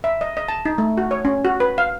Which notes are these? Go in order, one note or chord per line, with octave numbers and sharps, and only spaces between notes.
E5
D#5
D#5
A5
D#4
A3
F#4
C#5
C#4
F#4
B4
F5